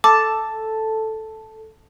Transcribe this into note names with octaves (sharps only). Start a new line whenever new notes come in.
A4 A5 D6